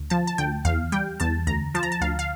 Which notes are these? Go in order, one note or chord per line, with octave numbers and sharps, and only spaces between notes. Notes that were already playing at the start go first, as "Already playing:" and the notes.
Already playing: D2
F3 A5
A5
D2 G5
E2 F5
G3 G5
E2 A5
D2 A#5
F3 A5
A#5
A5
D2 F5
F5